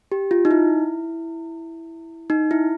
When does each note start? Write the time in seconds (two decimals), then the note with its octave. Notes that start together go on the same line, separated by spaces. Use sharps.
0.12 G4
0.31 F4
0.45 D#4
0.51 E4
2.30 D#4
2.51 E4